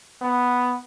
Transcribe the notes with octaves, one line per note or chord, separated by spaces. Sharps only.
B3